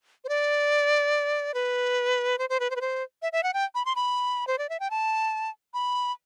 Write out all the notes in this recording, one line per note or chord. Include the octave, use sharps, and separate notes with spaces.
C5
D5
B4
C5
C5
B4
C5
B4
C5
E5
E5
F#5
G5
B5
C6
B5
C5
D5
E5
G5
A5
B5